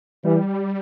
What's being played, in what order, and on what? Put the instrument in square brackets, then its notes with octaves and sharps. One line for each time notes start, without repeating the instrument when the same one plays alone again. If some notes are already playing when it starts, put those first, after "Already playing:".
[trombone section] E3 [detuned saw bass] G3